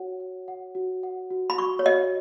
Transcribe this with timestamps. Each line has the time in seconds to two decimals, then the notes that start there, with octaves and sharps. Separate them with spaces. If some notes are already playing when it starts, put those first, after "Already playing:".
Already playing: F#4 C#5 F#5
0.20 F#5
0.48 F#5
0.75 F#4
1.03 F#5
1.31 F#4
1.50 B5
1.58 F#4 C#6
1.79 C#5
1.86 F#4 D#5